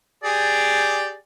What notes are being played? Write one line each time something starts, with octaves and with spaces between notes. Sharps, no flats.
G4 G#4 D5